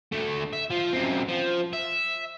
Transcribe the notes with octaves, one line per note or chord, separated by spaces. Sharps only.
D2 A3
E5
F3
F#2 C4
F3
E5